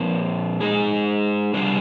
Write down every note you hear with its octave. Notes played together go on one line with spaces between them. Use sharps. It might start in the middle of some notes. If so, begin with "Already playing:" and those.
Already playing: A#2 F3 C4
G#3 D#4 G#4
C3 G3 D4 F4